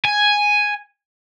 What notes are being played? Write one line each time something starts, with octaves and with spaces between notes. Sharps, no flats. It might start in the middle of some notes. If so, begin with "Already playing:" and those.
G#5